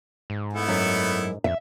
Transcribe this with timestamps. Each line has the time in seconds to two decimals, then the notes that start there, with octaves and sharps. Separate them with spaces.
0.30 G#2
0.53 A3 B3 E4
0.68 F#2
1.44 F2 E5